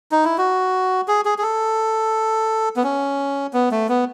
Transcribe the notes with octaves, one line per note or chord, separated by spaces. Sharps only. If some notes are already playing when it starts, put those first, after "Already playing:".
D#4
E4
F#4
G#4
G#4
G#4
A4
B3
C#4
B3
A3
B3